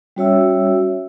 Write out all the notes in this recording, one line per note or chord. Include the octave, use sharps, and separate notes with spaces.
G3 C#4 F#4 C#5 E5 E6